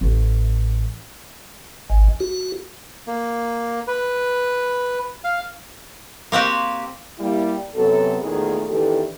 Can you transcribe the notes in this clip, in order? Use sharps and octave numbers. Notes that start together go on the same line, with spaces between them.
A1
G#1
F#4
A#3
B4
F5
A#3 C4 F#4 G4
G3 A#3 E4
F#2 C3 F#3 B3 A4
E2 A#2 D#3 A3 G#4
E2 D#3 E3 D4 G4 A4